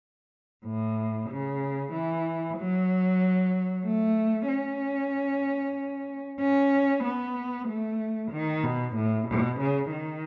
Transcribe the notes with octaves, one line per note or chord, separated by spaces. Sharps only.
A2
C#3
E3
F#3
A3
C#4
C#4
B3
A3
D#3
B2
A2
B2
C#3
D#3